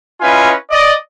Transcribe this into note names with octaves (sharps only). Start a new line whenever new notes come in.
C#4 E4 F4 B4 D#5 G#5
D5 D#5